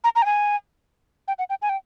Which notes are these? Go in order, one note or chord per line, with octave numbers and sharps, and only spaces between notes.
A#5
A#5
G5
G#5
G5
F#5
G5
G#5
G5